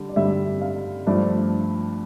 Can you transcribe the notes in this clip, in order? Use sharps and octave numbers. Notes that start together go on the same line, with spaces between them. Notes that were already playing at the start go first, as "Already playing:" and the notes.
Already playing: D3 G3
D5
G2 D3 G3 E5
F5
G2 F3 A3 D4